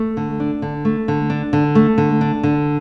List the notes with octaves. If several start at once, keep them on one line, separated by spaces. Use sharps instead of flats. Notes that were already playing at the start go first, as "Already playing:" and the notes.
Already playing: A3
D3
D4
D3
A3
D3
D4
D3
A3
D3
D4
D3